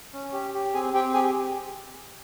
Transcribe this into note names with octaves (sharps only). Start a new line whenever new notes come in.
C#4
G4
G4
C4 G#4 G#5
C4 G4 G5
G4 G#4 G#5